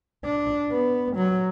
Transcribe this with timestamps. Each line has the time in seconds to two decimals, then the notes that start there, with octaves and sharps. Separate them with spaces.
0.25 D4
0.71 B3
1.16 F#3